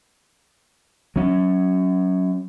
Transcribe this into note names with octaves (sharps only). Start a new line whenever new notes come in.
F#3 C#4